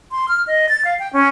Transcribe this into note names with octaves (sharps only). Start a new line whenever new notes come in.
C6
F6
D#5
A6
F5
G5
C#4